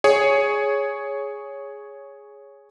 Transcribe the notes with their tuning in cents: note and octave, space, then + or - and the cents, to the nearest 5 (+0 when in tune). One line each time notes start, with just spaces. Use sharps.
G#4 +0 C#5 +0